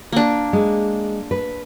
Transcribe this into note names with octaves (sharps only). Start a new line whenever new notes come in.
A#3 D4
G#3
B4